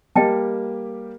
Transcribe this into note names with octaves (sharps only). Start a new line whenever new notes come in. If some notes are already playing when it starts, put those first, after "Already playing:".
G3 A#3 G4 D#5 G5 A5